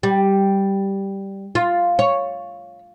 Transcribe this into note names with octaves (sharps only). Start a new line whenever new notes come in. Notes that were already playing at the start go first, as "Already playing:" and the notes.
G3
F4
C#5